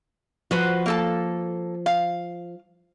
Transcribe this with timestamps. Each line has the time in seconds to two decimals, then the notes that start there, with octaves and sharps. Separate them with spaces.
0.51 F3 F#4 B4 C5
0.86 A#3 A4 A5
1.86 F5